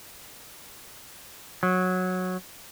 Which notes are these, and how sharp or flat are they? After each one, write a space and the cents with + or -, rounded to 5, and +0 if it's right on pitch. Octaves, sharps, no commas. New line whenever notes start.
F#3 -10